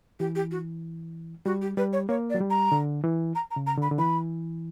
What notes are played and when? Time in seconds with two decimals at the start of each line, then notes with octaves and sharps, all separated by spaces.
0.20 E3 G4
0.35 G4
0.51 F#4
1.46 G3 F#4
1.62 G4
1.77 G3 B4
1.93 C#5
2.09 A#3 C#5
2.30 D5
2.34 F#3
2.40 G3
2.50 A#5
2.72 D3
3.04 E3
3.35 A#5
3.51 A#5
3.56 C#3
3.67 A#5
3.78 D3 B5
3.91 D3
3.99 E3 B5